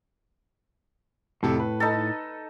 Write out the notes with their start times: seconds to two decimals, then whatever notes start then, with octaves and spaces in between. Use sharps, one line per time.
1.43 F2 A2 C3 A4
1.60 B4
1.80 D#4 A4